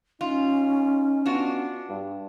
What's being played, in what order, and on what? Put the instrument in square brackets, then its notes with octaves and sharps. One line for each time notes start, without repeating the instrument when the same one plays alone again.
[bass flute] C#4 [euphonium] D#4 [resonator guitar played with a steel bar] F4
[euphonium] B3 [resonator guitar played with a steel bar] D4 F4 F#4
[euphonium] G2